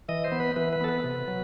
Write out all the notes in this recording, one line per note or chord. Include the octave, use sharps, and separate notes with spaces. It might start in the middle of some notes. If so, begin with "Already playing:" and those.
E3 D#5
C5
B3
B4
E3 B4
B4
B3 A4
B4
C3
F#3